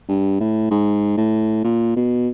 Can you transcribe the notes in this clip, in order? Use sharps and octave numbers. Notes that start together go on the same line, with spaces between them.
G2
A2
G#2
A2
A#2
B2